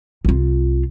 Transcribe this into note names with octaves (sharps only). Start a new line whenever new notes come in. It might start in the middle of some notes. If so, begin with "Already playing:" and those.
C2 F4